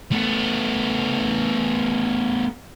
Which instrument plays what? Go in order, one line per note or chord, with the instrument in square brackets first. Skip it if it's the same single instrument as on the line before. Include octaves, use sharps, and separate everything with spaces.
[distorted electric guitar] A3 B3